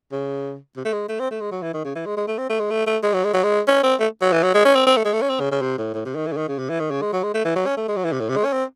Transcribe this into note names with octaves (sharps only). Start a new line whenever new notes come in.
C#3
C3
A3
G#3
A3
C4
A3
G#3
F#3
E3
D#3
C#3
E3
G#3
G#3
A3
C4
A3
G#3
A3
A3
G#3
F#3
G#3
F#3
G#3
C#4
C4
A3
F#3
E3
F#3
G#3
C#4
C4
C4
A3
G#3
A3
C#4
C4
C#3
C#3
C3
A2
A2
C3
D#3
E3
C#3
D#3
C#3
C3
E3
D#3
C#3
G#3
F#3
G#3
A3
E3
F#3
C#4
A3
G#3
F#3
E3
C3
A2
C3
G#3
C#4
C4